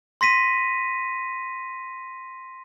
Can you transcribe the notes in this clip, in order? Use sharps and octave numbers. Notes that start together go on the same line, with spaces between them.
C6 A#6 B6 D#7